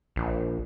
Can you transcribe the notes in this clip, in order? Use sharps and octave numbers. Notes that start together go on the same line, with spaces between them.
A#1